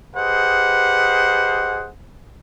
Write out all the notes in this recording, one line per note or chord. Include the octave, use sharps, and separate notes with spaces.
G4 G#4 B4 C5 D#5 F#5